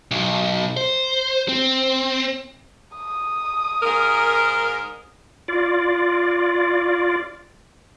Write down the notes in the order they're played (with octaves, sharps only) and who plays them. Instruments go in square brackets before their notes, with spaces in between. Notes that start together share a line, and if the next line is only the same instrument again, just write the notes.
[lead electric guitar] B1
C5
C4
[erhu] D#6
[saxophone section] G#2 A#4
[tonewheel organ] F4 D5